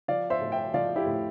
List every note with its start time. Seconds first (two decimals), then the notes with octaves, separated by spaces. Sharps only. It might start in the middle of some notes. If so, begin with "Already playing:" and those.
0.08 F3 D5 F5
0.30 C5 E5
0.42 A2
0.52 E5 G5
0.74 F3 D5 F5
0.96 E4 G4
1.07 A2